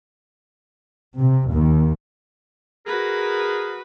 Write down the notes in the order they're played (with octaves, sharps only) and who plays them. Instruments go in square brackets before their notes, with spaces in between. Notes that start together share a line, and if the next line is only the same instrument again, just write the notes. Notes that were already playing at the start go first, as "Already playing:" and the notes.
[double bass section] C3
D#2
[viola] F#4 B4 [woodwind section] G#4 A#4